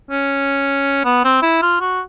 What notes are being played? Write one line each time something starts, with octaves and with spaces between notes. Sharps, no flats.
C#4
B3
C4
E4
F4
F#4